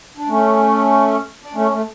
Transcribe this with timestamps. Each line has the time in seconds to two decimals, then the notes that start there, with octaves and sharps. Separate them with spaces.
0.17 D4
0.28 A3 C#4
1.42 D4
1.54 A3 C#4
1.71 A3